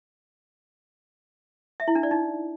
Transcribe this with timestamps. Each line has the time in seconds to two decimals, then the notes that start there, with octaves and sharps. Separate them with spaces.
1.80 E5
1.88 E4
1.95 D4
2.03 D5
2.11 D#4